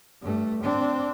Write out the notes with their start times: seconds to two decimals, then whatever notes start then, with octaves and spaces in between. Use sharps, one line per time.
0.22 G2 A3
0.62 C4 D4